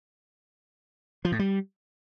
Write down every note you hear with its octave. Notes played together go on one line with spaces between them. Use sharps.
F3
A2
G3